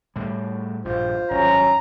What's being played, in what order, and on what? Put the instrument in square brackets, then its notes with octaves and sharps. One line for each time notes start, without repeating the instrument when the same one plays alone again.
[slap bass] A2 G3
[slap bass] A#1 G2 [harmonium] F4 C5
[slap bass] G#1 F#2 F#3 [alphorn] C#4 [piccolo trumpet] A#5